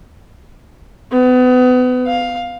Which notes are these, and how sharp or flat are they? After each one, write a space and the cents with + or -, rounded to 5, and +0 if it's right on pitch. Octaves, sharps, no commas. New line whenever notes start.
B3 +30
F5 +10